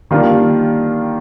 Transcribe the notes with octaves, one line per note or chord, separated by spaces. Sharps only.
D#3 G3 A#3 D4 F4